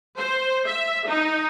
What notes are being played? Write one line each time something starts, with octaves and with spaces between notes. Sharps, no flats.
C5
E5
D#4